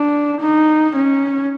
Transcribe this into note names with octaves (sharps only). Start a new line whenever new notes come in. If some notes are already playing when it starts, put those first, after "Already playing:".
Already playing: D4
D#4
C#4